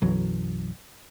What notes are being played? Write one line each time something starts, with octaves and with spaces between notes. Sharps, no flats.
B1 F#2 E3 F#3